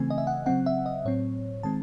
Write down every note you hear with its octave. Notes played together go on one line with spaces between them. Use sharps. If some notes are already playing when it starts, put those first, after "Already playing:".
Already playing: C#3 E3 A3 C4 G#5
D#5
E5
F#5
C#3 F#3 C4 F#5
E5
D#5
A2 F#3 C4 C#5
D#3 G#3 C4 A5